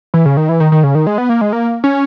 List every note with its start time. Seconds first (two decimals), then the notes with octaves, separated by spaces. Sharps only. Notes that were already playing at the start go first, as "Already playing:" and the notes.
0.14 E3
0.26 C#3
0.37 D#3
0.49 E3
0.60 D#3
0.72 D#3
0.83 C#3
0.95 D#3
1.07 G#3
1.18 B3
1.29 A#3
1.41 G#3
1.53 A#3
1.84 C#4